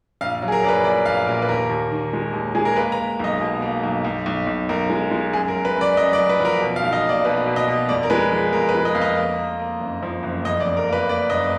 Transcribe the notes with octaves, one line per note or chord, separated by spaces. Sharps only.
A#1 F5
F#3
G#4
A#4
A#1 D5
B4
A#1 D5
A#1 F5
A#2 A#4
B4
D#2 A#4
D#2
D#3
G#3
D#2
G#3 G#4
A#4
A#3 B4
A#5
A#3
B1 D#5
B2
A#3
B1
B1
B1
B1
B1 A#4
G#3
G#3
F#2 G#4
A#4
F#2
B4
F#2
D5
F#2 D#5
D5
F#2
B4
F3
A#4
B2
F5
B1
D#5
A#3
D5
B2 B4
B2
D#5
B2
F2 D5
A#4
G#3 B4
F3 G#4
F2 A#4
B4
G#3
D#5
F2 F5
D#5
A#3
A#3
A#3
F#1
F3
F#1
F2 D#5
D5
F2
A#4
A#3 B4
A#3 D5
F#1 D#5